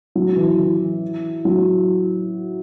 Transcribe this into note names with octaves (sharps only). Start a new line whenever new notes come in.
F#3
E3
E3
F#3